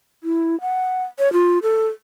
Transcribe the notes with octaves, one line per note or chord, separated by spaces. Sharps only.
E4
F#5
C#5
F4
A4